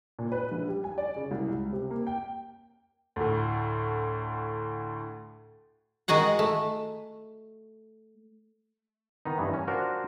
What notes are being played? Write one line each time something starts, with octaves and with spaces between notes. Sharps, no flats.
A#2
B4
A#1
G3
G#5
D5
C#3
C2
C#2
C3
A#3
G5
D2 A2
D#3 G#3 F#4 G#4 F#5
A3
D#3 B3 D#4
G2 E3
C#4
D4 F4 F#4 A#4 C5